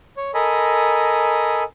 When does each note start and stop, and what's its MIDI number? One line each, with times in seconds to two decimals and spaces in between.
0.17 0.31 73
0.34 1.63 69
0.34 1.63 70
0.34 1.63 75
0.34 1.63 80
0.34 1.63 83